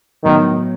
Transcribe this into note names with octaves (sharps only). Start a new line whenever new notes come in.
A2 D#3 F#3 B3